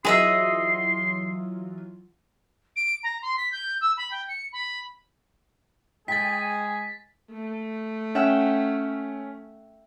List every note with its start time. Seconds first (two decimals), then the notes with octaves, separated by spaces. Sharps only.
0.05 E3 F#3 F4 G#4 D#5 E5 C6
2.76 D7
3.03 A#5
3.22 C6
3.37 B6
3.52 G6
3.81 E6
3.97 B5
4.11 G5
4.28 C#7
4.53 B5
6.08 G#3 G#4 G5 G#5 A6 B6
7.32 A3
8.15 C#4 E5 F#5 G5